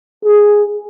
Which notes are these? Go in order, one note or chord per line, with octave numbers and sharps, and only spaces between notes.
G#4